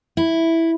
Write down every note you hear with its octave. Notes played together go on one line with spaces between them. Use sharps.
E4